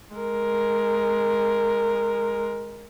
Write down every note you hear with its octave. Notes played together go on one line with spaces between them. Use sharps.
G#3 A#4